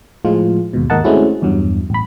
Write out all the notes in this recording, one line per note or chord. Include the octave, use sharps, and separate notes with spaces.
A2 F3 G#3 F4
D#2 G#2 B2
D#2 G#2 A#4 D#5 F#5 A5
G#3 A3 C4 C#4 E4 F#4
E2 G2 F#3
A1 B5